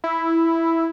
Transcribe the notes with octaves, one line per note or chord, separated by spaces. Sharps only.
E4